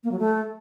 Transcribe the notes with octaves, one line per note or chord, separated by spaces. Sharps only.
A#3
F#3
A3